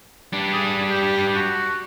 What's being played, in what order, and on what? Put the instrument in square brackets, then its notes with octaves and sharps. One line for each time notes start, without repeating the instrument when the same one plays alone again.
[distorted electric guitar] G3 D4
[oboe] G#4
G4
F#4